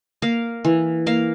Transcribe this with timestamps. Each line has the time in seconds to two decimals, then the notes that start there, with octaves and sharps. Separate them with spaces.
0.22 A#3 F5
0.65 E3
1.06 A#3 F5